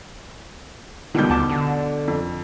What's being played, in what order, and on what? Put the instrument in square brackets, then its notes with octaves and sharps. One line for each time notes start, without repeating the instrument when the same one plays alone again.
[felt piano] B2 G6 [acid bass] D3 [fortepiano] D#3 F3 G3
[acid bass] D2 [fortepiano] F#5 A5 D6
[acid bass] D3
[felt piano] F2